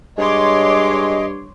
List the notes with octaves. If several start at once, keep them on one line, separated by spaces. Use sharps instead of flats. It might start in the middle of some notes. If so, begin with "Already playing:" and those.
G2 G#3 C#5 D#5 C6 D6